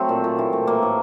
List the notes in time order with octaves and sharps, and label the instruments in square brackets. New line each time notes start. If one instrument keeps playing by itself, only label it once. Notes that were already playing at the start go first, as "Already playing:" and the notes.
Already playing: [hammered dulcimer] F#3 A3 C4
A#2
A#2
E3
A3
A2 A#3
A2